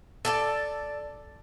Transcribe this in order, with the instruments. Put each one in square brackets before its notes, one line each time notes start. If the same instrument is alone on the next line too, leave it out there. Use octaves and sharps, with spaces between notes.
[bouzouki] A4 D5 A5